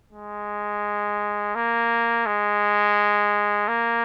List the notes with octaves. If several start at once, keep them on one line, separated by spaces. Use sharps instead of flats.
G#3
A#3
G#3
A#3